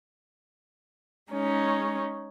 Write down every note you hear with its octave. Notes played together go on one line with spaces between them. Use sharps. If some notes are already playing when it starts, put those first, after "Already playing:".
G#3 C#4 D#4 C#5